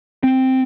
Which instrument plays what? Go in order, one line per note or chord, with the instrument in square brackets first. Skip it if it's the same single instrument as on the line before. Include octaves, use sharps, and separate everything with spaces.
[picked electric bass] C4